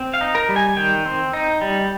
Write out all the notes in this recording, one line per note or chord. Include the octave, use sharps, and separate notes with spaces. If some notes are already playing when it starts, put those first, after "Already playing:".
Already playing: C4
F5
D#4
A#4
G3
G#5
D#3 G5
C4
D#4
G3